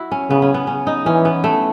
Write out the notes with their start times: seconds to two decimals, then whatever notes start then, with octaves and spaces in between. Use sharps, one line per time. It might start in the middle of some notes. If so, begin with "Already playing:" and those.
Already playing: E4 F#4
0.12 C#4
0.30 C#3 B3
0.42 C#4
0.54 B3
0.67 C#4
0.87 D#4
1.05 E3 C#4
1.25 B3
1.44 A3